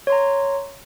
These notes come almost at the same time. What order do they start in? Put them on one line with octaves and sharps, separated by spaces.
C#5 C6 A#5